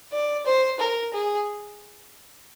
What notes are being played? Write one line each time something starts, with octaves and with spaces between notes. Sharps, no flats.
D5
C5
A#4
G#4